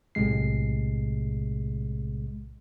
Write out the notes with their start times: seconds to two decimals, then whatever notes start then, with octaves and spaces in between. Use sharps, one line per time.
0.15 B1 A2 C3 G#3 C7